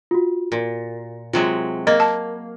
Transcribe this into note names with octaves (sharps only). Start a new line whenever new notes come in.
F4 F#4
A#2
C3 F#3 G#3 F4
A#3 D#5 G#6
A5